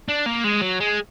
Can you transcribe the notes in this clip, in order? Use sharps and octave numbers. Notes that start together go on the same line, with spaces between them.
D4
A#3
G#3
F#3
G#3